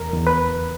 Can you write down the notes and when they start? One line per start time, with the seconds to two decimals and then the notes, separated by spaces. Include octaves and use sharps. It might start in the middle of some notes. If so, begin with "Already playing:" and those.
Already playing: E2 A#4
0.13 E2
0.27 B4